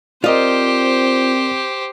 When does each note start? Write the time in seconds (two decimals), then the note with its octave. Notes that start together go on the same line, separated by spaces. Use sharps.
0.24 C4 F4 G4 A#4 C5 D5 D#5